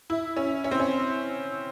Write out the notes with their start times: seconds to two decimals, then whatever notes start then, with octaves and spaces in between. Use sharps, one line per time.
0.10 E4
0.37 C#4
0.64 C#4
0.71 C4
0.80 C#4